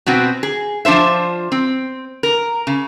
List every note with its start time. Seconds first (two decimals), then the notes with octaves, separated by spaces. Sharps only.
0.06 B2 B3 C4 F#4
0.43 G#4
0.85 F3 D4 F4 C5 E5
1.52 C4
2.23 A#4
2.67 C#3